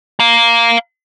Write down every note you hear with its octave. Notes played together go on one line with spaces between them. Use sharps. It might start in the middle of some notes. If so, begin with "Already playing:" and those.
F5 A#5